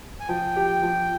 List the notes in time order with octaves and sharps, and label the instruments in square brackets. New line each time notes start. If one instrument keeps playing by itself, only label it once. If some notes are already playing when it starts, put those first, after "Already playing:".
[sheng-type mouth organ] G#5
[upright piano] F3 [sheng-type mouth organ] G5
[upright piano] G4
F3